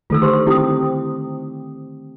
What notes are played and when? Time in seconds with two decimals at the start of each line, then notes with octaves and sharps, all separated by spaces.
0.10 D3 D#3 A3 F4 A4 E6
0.22 G4 C5 C6
0.47 C4 E4 G4 D#6